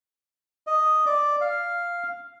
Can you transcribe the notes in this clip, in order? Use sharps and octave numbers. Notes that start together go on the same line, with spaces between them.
D#5
D5
F5